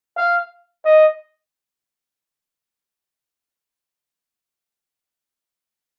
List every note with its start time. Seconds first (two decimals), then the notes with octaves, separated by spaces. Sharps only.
0.17 F5
0.85 D#5